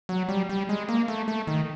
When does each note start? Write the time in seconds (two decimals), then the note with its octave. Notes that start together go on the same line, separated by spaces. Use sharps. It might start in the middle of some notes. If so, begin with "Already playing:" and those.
0.09 F#3
0.29 G3
0.49 G3
0.69 G#3
0.89 A#3
1.08 A3
1.28 A3
1.47 D#3